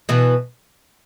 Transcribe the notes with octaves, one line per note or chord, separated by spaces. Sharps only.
B2 E3